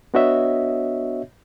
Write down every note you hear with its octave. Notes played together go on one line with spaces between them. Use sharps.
B3 D4 F#4 C#5 D#5 E5